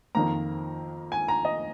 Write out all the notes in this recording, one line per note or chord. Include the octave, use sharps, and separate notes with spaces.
F2 D#3 A#3 A#5
G#5
A#5
D#5